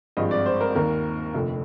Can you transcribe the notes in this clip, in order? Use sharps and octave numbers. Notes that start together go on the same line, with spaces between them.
G#1 G2 F3 G#3 C4 D#5
D5
C5
A#4
D#2 D#3 A#3 A#4
F1 F2 D3